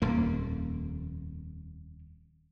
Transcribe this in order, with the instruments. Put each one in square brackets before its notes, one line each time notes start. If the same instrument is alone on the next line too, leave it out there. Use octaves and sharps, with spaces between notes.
[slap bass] D#1 F2 A#3